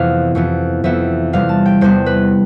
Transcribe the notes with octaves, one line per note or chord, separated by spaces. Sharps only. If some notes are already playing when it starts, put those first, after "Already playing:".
Already playing: F2 C3 E3 B3 F5
F2 E3 B3
F2 E3 B3 E5
E2 C3 G3 B3 F5
A5
G5
E2 C3 G3 B3 C5
B4